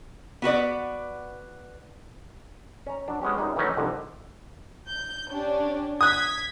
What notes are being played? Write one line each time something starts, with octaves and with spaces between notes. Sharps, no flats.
B3 F#4 B4 D5
C#4 A#5
F#3 D4
G#3 B3 C#4 G4
F#2 G3 D#4 G#4
D#3 E3 F#3 A3 C#4 D#4
C2 F2 G#2 D3
G6
C#4 D4 G4
D#6 F#6 G#6 B6